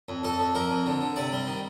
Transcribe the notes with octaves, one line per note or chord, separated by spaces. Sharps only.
F2
F2 A4
F2
F3 A#4
F2
D3
D3
C3 D5
G3
D#3